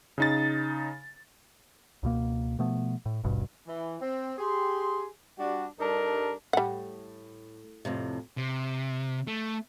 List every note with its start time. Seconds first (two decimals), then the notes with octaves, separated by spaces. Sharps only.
0.18 C#3 D#4 A6
2.03 C#2 B2 A#3
2.59 B2 F3 A3 B3
3.06 A2
3.24 D#1 G#1 G2 B2
3.67 E3
4.01 C4
4.38 G4 G#4 C6
5.38 G3 D4 F#4
5.79 G2 G3 D4 D#4 A4 A#4
6.53 A2 G3 F#5
7.85 F2 A2 C3
8.37 C3
9.27 A3